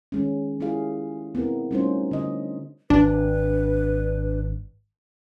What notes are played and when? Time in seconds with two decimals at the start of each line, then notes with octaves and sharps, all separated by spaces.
0.12 D#3 G#3 C#4
0.60 G#3 E4 F4 G4 G#4 F5
1.35 B3 C4 E4 A#4
1.71 G3 A3 C#4 D#4 F4 C5
2.11 D3 D#5
2.90 G#1 D4 B4